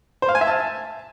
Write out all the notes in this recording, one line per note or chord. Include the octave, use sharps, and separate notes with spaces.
C5
F5
G#5
E5
A5